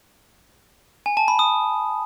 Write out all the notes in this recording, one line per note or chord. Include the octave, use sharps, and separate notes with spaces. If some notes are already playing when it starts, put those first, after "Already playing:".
G#5
A5
B5
D#6